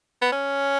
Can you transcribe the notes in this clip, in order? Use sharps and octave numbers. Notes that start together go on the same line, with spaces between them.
B3
C#4